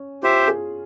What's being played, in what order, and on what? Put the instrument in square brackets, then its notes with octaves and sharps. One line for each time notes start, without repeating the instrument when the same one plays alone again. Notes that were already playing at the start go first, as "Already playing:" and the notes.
Already playing: [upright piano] C#4
[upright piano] F4 [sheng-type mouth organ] G4 C5 E5
[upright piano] G#4